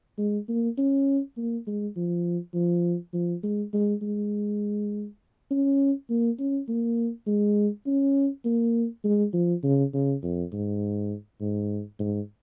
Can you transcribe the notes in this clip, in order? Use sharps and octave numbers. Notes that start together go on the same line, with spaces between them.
G#3
A#3
C#4
A#3
G#3
F3
F3
F3
G#3
G#3
G#3
C#4
A#3
C#4
A#3
G#3
C#4
A#3
G#3
F3
C#3
C#3
F2
G#2
G#2
G#2